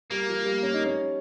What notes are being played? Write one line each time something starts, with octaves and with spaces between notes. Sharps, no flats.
G3 A#3
F3
G3
C#4
D#4
C#4